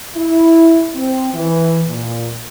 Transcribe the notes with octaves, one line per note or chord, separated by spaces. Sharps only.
E4
C4
E3
A#2